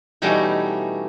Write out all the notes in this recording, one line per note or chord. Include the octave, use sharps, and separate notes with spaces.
B2 E3 G3 A3 C#4 D#4